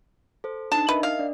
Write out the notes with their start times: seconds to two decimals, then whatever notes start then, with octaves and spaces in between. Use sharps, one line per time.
0.44 A4 C5
0.72 D4 D#4 A5
0.89 A#4 B4 D#5 E5
1.03 F5
1.19 D4 D5